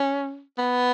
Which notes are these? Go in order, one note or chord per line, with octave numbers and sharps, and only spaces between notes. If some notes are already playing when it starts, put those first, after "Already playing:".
Already playing: C#4
B3